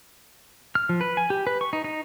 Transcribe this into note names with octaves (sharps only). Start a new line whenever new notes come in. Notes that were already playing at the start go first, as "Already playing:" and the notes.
F6
F3
B4
G#5
G4
B4
C#6
D#4
D#4